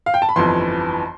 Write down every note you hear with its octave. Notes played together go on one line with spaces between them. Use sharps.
F5
G5
A5
B5
G1 F2 E3 C6